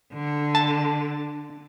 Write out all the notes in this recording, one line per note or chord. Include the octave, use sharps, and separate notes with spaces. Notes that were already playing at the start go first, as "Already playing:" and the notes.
D3
A5